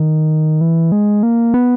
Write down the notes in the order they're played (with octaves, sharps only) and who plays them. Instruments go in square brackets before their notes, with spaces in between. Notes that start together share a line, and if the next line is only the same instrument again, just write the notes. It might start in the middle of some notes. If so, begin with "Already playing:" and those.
Already playing: [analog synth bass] D#3
E3
G#3
A#3
B3